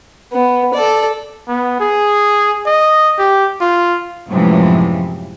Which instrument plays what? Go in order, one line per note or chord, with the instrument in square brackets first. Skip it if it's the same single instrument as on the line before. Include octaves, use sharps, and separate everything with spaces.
[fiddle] B3
A4 D5
[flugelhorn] B3
G#4
D#5
G4
F4
[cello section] F#2 A2 C3 E3 F3 G#3